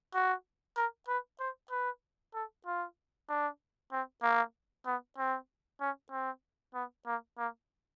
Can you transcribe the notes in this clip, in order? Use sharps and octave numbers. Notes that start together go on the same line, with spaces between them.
F#4
A#4
B4
C5
B4
A4
F4
D4
C4
A#3
B3
C4
C#4
C4
B3
A#3
A#3